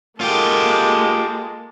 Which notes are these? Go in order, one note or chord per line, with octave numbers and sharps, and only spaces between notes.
G#3 A#3 F4 G4 A4